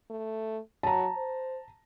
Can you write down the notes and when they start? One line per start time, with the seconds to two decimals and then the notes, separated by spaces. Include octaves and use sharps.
0.10 A3
0.83 F#3 A5 A#5
1.17 C5